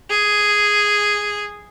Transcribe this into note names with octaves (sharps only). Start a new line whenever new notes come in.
G#4